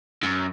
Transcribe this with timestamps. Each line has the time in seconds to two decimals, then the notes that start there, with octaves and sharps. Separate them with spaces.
0.23 F#2